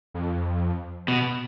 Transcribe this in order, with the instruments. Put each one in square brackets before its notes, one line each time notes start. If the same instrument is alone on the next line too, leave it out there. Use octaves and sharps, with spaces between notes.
[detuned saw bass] F2
[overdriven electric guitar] B2